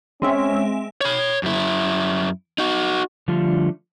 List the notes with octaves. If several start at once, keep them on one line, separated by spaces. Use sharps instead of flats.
G#3 C4 C#4 E5
C#5 B5
F#2 E4
D#4 F#4
D3 F3 G3 A3 D4 F4